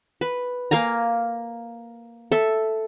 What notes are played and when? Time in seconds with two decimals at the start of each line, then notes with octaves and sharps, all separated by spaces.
0.21 B4
0.71 A#3 F5 G#5 A#5
2.32 A4 E5